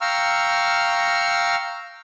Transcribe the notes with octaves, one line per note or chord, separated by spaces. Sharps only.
F5 G5 A#5 C#6 E6 F6